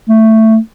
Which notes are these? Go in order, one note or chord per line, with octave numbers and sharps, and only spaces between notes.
A3